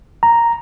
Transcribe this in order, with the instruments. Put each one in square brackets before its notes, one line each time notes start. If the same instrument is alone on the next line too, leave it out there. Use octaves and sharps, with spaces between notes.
[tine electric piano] A#5